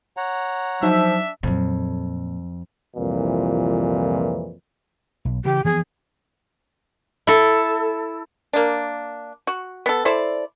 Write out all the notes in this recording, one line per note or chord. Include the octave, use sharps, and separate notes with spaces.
C#5 F#5 A#5
F3 F#3 D4 D#4 E5
F2 A#2 F#3
C2 F2 A#2 E3
B1
C#3 E3 G4
E3 F3 B3 G#4
E4 A4
A#3 D4
F#4
B3 A4
E4 A4 C5 D5